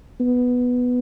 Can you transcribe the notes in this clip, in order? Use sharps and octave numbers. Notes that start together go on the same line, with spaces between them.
B3